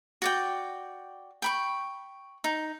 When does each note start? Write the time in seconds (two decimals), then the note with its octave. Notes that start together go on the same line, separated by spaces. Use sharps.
0.22 F#4 D5 G5
1.42 G5 B5 C#6
2.44 D#4